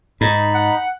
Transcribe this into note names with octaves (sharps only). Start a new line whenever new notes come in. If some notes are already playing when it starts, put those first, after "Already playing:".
G#2 D#4 B5
F#5